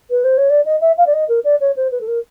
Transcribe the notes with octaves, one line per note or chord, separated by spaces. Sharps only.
B4
C5
C#5
D5
D#5
E5
F5
D5
D#5
A#4
D5
C#5
C5
B4
A4
A#4